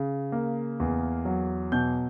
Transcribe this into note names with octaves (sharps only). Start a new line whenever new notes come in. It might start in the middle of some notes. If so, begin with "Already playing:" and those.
Already playing: C#3
A#3
E2
F#3
B2 G6